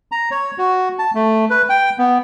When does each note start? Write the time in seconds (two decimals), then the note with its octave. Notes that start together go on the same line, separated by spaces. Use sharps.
0.12 A#5
0.31 C#5
0.58 F#4
0.99 A5
1.15 A3
1.50 B4
1.69 G5
1.98 B3